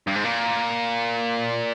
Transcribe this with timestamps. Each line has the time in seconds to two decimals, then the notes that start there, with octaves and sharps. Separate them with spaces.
0.07 G2
0.15 G#2
0.24 A#2